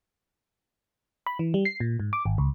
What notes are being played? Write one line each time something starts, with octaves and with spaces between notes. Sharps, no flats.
B5
E3
G3
C7
A#2
G#2
D6
G#1
C#2